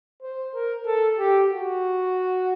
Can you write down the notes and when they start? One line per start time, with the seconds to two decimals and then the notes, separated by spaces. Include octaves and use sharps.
0.23 C5
0.54 A#4
0.86 A4
1.18 G4
1.51 F#4